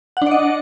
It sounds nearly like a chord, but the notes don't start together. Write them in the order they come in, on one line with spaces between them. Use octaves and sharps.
F#5 D4 D5 D#5